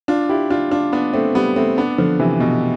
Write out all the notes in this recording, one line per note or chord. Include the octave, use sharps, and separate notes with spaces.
D4 F4
E4 G4
D4 F4
D4 F4
B3 D4
A3 C4
G3 B3
A3 C4
B3 D4
D3 F3
C3 E3
B2